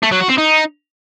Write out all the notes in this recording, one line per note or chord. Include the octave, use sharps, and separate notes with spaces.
A3
F#3
F#4
C4
D#4